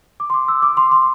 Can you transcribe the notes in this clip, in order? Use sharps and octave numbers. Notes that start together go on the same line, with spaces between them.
D6
C6
D6
E6
D6
C6
C6